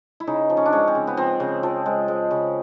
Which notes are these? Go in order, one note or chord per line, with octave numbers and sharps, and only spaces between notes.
E4
C#3 D#4
F3
C#4
D4
G#3 C#4
C4
C#3
B3
F3 C4
C#3
F3
G#3
G#3
C#3